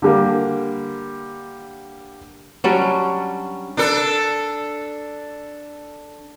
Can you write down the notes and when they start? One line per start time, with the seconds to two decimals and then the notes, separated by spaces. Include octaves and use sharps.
0.02 D3 G3 A#3
2.64 F#3 G3 C#4 D4
3.77 D4 A4